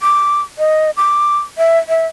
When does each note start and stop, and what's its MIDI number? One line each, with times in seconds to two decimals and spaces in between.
0.01 0.41 86
0.59 0.91 75
0.97 1.39 86
1.58 1.79 76
1.89 2.06 76